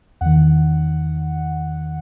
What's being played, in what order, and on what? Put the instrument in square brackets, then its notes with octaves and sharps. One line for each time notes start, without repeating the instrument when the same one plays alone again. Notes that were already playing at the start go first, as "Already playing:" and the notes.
[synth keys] E2 D#3 F#5